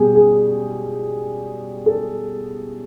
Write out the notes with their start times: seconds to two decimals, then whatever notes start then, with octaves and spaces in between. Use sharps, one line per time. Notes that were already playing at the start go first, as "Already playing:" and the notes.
Already playing: B2 G3 G4 G#4
0.15 G#4
1.86 A4